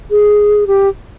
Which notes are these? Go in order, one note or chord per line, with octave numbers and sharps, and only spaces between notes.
G#4
G4